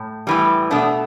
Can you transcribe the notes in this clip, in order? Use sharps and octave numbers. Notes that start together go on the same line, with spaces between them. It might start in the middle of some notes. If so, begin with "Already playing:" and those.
Already playing: A2
A2 E3 G3
B2 A3 D4